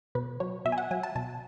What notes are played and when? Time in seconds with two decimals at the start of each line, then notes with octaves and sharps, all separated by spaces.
0.15 B2 B4
0.40 F#3 C#5
0.65 B2 E5
0.72 G#5
0.78 F#5
0.91 F#3 G#5
1.03 A5
1.15 B2 A5